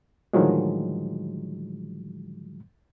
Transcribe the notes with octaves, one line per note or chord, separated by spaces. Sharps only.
A2 D3 D#3 F3 F#3 G#3